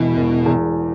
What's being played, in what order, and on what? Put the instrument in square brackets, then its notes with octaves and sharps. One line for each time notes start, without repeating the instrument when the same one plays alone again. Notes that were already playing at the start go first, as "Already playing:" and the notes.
Already playing: [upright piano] E1 E2 E3 [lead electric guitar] B2
[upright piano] E1
E2